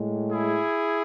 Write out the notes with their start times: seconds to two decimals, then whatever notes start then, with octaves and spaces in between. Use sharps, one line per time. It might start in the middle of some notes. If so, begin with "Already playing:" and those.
Already playing: A2 G#3
0.32 E4 G#4